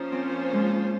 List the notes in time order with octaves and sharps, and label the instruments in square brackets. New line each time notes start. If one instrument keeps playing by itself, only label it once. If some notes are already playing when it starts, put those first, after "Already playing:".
Already playing: [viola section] F3 A#3 C#4 F4 C5 [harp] D#4
[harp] C4
G#3